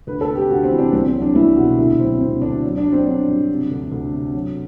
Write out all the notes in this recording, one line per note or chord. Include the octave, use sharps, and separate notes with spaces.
D2 B4
A4
C3
G4
D2 F#4
C4
E3
D4
C2 C4
C4
F#3
D4
C2 E4
B2 F#4
D2 E4
F#3 C4
D2 C4
D2 D4
F#3
D4
F#3
C4
F#3 D4
G2
C3
D2
D2
C3
F#3